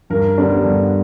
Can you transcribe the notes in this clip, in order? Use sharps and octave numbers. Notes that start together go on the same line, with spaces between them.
G2 A#4
D3 G3 B3 D4
G2